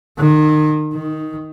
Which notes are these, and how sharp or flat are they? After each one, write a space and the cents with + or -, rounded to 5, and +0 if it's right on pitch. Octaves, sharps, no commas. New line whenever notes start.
D#3 -30
D#3 +5